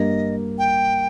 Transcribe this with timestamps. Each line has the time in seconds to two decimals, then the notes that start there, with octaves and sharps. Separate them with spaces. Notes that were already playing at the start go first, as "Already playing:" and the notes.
Already playing: G2 G3 A#3 D#5
0.58 G5